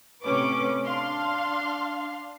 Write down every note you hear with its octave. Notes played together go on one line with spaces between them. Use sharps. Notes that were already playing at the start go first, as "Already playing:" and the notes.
A2 C3 C#4 B4 D6
D4 F5 C6